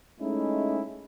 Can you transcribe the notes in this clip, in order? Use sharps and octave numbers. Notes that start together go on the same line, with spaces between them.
G#3 A3 C#4 D#4 E4